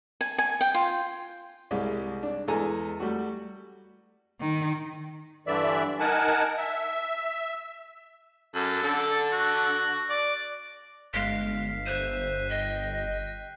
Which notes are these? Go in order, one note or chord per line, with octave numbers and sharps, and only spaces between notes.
G#5
G#5
G5
F4
C2 G3 G#3
D4
E2 G#3 A4 G#5 A#5
G3 A3 F#4
D#3
G2 D3 E3 D5 E5
D#4 A#4 F#5 G#5 A5
E5
F#2 A4
D3
F#4
D5
G1 G#3 F5 B6 C7
C5 E5 F#6 D#7
D#5 G5